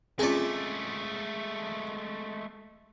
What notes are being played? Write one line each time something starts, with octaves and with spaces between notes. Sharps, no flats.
G#3 A3 C4 C#4 F4 G#4 D5